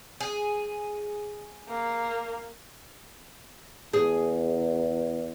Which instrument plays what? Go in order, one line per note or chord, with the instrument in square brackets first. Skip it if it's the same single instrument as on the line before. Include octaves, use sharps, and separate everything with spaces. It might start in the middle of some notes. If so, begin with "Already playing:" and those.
[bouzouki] G#4
[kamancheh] A#3
[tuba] E2 [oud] G#4